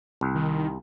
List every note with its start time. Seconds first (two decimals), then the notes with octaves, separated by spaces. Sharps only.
0.21 C2
0.35 D#3